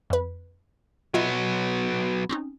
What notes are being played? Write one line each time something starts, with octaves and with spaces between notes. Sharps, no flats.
F2 B4
F#3 B3 F4 D#5 E5
C4 C#4 D#4